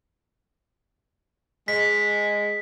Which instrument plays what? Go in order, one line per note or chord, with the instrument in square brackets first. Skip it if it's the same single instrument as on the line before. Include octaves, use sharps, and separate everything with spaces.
[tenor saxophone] G#3 [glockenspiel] B6